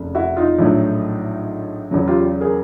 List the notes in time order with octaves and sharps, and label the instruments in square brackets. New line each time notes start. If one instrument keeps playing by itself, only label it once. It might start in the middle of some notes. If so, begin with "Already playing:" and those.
Already playing: [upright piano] F1 C#3
E4 F#4
D#4 F4
A#1 A2 F#3 A3
E2 C#3 F#3
F4 G4
G#4 A#4